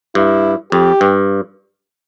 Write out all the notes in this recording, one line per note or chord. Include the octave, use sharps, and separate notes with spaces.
G2 E4
F2 G4
G2